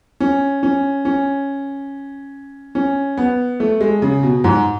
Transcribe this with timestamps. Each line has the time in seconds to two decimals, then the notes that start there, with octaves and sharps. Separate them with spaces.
0.20 C#4
0.63 C#4
1.05 C#4
2.75 C#4
3.18 B3
3.60 A3
3.81 G#3
4.02 C#3
4.23 B2
4.44 G#2